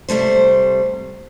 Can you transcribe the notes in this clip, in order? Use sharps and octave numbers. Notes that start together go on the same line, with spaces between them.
C3 G3 A3 C5